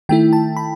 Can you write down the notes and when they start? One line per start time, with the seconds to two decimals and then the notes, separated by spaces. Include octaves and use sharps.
0.09 D#3 A3 E4 G5
0.33 A5
0.57 B5